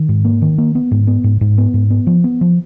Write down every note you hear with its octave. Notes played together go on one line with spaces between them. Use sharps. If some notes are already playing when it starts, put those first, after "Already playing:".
Already playing: D#3
G#2
A#3
D#3
A#3
B3
G#2
B3
G#2
G#2
B3
G#2
B3
F3
B3
F3